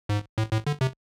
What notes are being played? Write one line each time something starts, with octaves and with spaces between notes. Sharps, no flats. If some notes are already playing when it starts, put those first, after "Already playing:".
G#2
A2
A2
D3
C3